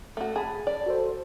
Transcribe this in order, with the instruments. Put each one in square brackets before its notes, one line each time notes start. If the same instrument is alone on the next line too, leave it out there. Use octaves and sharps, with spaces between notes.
[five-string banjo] A3 F#4
[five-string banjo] G#4 [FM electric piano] A5 B5
[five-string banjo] D5
[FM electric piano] F#4 A4 C5